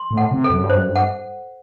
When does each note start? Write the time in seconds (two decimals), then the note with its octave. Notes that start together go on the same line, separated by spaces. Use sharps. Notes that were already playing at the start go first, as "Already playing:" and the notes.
Already playing: C6
0.11 A2
0.17 F#5
0.31 C3
0.44 A4
0.50 F#2
0.63 G2
0.70 C5
0.76 F#2
0.88 G2
0.96 F#5